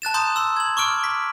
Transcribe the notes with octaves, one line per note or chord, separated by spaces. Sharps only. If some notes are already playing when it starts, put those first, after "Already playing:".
A5 F#6 A6 E7
A#5 C6 D#6 G6
C6 E6
G#6 F#7
C#6 D6 F6 D7
B6